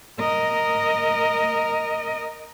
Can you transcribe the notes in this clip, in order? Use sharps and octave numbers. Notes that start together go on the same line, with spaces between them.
A#4 D#5